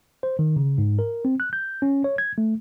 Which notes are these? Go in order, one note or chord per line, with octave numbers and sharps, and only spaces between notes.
C5
D#3
C#3
G#2
A#4
C4
F#6
G6
C#4
C#5
G#6
A3